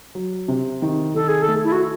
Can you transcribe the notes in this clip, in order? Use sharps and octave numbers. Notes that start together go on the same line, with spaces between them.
F#3
C3
D#3
D#3 A4
G#4
A4
A3
E4
F#4